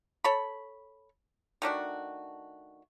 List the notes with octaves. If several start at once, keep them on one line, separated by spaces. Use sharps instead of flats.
A4 C#5 B5
D#3 A3 D4 F#4